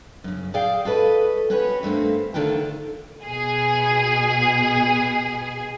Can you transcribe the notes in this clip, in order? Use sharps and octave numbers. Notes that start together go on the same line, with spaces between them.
F#2 C#3
G#4 D5 E5 F5 G5
F#4 A4 B4 D#5
C#4 F#4 G4 B4 C#5
G2 A3 A#3 C4
D2 D3 D#3 D4 F4 G5
B2 G#4